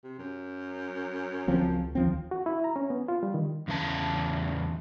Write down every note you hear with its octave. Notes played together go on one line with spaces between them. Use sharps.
C3
F#2
C#2 F3 C4
D#2 F3 C4
F#4
E4
A#5
C#4
B3
F4
G3
D#3
E2 C#3 D#4 A5